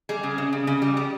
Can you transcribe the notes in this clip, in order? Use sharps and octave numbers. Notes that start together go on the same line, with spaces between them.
G3 G#4
C#3
C#3
C#3
C#3
G3
G3